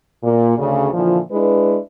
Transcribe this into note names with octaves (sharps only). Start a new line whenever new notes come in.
A#2
D2 C#3
A#2 D3 E3 F3
G#3 D4 E4 B4